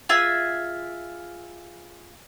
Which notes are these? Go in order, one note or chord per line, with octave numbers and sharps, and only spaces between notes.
F4 G#4 E5